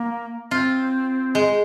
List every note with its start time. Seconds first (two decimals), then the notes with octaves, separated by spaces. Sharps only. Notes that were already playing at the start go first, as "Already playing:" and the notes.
Already playing: A#3
0.51 C4 F4
1.35 G#3